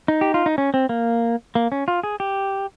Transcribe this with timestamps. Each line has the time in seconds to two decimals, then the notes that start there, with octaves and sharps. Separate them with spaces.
0.08 D#4
0.21 G4
0.34 F4
0.46 D#4
0.58 C#4
0.74 C4
0.89 A#3
1.55 A#3
1.72 C#4
1.88 F4
2.03 G#4
2.20 G4